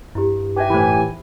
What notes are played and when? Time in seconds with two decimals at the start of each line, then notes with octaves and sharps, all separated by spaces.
0.15 G2 E4 G4
0.57 D#4 G4 B4 E5 G#5
0.70 A2 E3 C5 B5